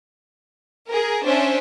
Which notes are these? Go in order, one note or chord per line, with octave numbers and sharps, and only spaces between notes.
G#4 A#4
C#4 D4 C5 E5